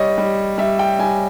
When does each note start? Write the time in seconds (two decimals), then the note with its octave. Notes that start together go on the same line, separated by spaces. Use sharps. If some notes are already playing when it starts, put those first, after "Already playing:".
Already playing: G3 C#5 D#5
0.18 G3
0.58 G3 E5
0.79 G5
0.99 G3 G#5